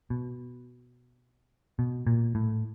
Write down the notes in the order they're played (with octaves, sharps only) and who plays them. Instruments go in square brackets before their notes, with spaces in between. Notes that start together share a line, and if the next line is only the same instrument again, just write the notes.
[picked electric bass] B2
B2
A#2
A2